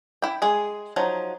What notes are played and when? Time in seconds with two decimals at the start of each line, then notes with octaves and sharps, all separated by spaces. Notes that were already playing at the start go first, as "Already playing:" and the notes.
0.22 E4 G5
0.42 G#3 G#4
0.96 F3 F#3 D#4